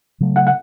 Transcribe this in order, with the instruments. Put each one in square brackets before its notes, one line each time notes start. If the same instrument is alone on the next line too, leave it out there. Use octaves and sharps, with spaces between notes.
[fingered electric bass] C#3 F#3 A3
[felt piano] F#5
F#5